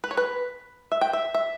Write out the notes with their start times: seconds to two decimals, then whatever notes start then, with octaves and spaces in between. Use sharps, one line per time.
0.04 B4
0.11 C#5
0.17 B4
0.92 E5
1.01 G5
1.13 E5
1.34 E5